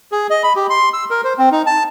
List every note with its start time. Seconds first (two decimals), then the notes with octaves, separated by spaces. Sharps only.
0.12 G#4
0.30 D#5
0.43 B5
0.56 G4
0.70 C6
0.93 E6
1.10 A#4
1.24 C5
1.39 C4
1.52 D#4
1.66 A5